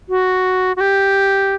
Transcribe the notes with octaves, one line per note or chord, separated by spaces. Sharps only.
F#4
F#4
G4